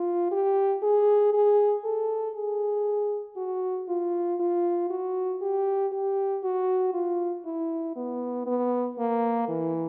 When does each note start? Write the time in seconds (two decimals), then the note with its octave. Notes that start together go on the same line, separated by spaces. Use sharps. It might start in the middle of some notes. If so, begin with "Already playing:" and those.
Already playing: F4
0.31 G4
0.83 G#4
1.33 G#4
1.84 A4
2.35 G#4
3.37 F#4
3.89 F4
4.40 F4
4.90 F#4
5.42 G4
5.92 G4
6.44 F#4
6.94 F4
7.45 E4
7.96 B3
8.47 B3
8.98 A#3
9.48 E3